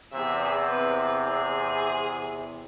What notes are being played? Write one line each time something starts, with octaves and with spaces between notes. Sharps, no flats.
E2 C3 G#4 E5
C4 B4
G#4